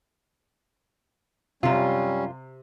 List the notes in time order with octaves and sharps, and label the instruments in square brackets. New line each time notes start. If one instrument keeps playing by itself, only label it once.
[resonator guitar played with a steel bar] F#2 F4 [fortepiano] C3 [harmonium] G3 C#4